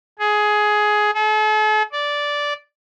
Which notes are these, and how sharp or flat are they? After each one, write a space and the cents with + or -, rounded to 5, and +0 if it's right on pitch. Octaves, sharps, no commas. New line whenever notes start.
G#4 +15
A4 -45
D5 -10